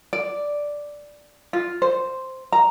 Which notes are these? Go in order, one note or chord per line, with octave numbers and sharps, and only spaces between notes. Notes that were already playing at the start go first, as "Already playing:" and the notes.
D5
F4
C5
A#5